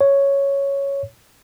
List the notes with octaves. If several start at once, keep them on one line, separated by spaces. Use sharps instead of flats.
C#5